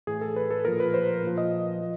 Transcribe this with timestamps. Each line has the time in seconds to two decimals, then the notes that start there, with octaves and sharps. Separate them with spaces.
0.07 A2 E3 G#4
0.21 A4
0.36 B4
0.51 A4
0.65 A#2 F3 A#4
0.80 B4
0.94 C5
1.23 A#2 F3
1.38 D#5
1.81 F3